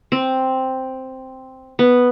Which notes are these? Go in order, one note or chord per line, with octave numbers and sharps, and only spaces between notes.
C4
B3